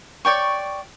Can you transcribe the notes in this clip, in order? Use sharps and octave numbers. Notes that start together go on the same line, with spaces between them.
C#5 D5 G5 C#6